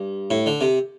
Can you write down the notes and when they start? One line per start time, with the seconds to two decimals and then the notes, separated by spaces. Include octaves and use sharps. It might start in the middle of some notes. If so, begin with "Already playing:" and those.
Already playing: G2
0.31 A2
0.46 D3
0.61 C3